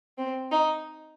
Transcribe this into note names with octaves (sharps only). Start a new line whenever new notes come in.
C4
D#4